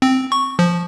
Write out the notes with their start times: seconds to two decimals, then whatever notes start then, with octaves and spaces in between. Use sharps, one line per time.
0.02 C4
0.32 C#6
0.59 F3